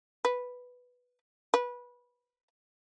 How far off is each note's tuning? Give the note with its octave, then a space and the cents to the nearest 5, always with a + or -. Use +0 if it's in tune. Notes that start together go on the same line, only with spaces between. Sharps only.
B4 +0
B4 -20